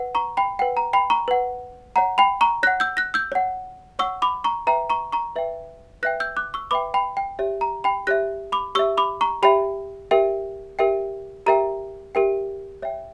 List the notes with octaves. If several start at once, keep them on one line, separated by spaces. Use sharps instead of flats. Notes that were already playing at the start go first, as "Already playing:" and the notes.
Already playing: B4 F#5
A#5 C#6
G5 B5
B4 F#5 G5
A#5
G5 B5
A#5 C#6
B4 F#5
C#5 F#5 A#5
G5 B5
A#5 C#6
C#5 F#5 F#6 A#6
E6 G6
F#6 A#6
E6 G6
C#5 F#5
C#5 F#5 C#6 E6
B5 D6
A#5 C#6
B4 E5 G5 A#5
A#5 C#6
A#5 C#6
B4 E5 G5
B4 E5 G5 F#6 A#6
E6 G6
D6 F#6
C#6 E6
B4 E5 G5 B5 D6
G5 B5
G5
G4 C#5 E5
A#5
G5 B5
G4 C#5 E5 F#6 A#6
B5 D6
G4 C#5 E5 C#6 E6
B5 D6
A#5 C#6
G4 C#5 E5 G5 B5
G4 A#4 E5 G5
G4 A#4 E5 G5
G4 A#4 E5 G5 A#5
G4 A#4 E5 G5
C#5 E5 G5